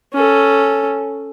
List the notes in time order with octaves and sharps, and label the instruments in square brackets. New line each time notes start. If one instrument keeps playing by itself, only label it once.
[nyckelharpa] C#4 A4